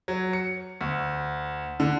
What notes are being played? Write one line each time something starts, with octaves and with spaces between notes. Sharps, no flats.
F#3
C#7
D2
D3